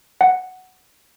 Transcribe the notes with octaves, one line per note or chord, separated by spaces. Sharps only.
F#5